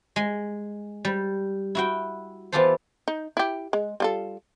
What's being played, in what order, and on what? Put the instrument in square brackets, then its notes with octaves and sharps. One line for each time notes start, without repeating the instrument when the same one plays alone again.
[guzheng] G#3
G3
E4 F#4 G5
E3 B3 F4 G4 A4 C5
[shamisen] D#4
E4 G4
G#3
G3 F4 A4